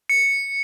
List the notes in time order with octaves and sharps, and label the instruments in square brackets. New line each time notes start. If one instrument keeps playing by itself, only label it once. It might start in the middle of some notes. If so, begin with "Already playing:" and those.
[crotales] C#7